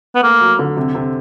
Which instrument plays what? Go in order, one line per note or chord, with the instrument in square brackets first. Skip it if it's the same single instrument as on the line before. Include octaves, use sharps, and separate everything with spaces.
[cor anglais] B3
[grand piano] A3 [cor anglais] A#3
[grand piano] F#3
D3
C3
C3